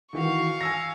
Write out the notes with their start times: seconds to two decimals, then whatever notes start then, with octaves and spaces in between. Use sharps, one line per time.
0.13 D#3 E3 F#4 F5 C#6
0.61 G#5 E6 A#6